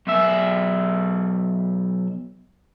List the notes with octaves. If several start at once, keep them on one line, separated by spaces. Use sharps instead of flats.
B1 E5